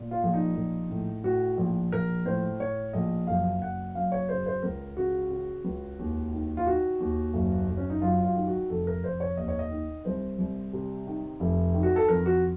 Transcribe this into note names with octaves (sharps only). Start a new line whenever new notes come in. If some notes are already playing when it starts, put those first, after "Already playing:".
Already playing: A#2
F4
A#1
D#4
A#1
A2
A2 F#4
A#1
A#1 A#4
A2 C5
A2 C#5
A#1 D#5
F#1 F5
F#1 F#5
F#2 F5
C#5
C#3 C5
C5
C#2 A#4
C#3 F#4
C#3
C#2
D#2
D#3
F4
D#3 F#4
D#2
F#1
F#1
C#4
D#4
F#2 F4
F4
D#3
F#4
F1 A4
A#4
F1 C5
C#5
D#2 D#5
C#5
D#5
D#3
C2 C5
C2
C3
D#3
F1
D#3
F#4
A4
F2 A#4
F#4